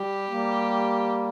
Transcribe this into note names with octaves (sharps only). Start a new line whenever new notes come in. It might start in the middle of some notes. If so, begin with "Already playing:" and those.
Already playing: G3 G4
G3 A#3